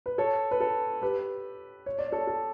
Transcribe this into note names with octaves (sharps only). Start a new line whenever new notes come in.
B4
A4 C#5
B4
A4
G4 B4
C#5
D5
A4 C#5
A4